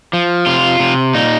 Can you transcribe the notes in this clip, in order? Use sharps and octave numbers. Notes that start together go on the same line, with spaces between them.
F3
C3 F4
C3
A#2 D#4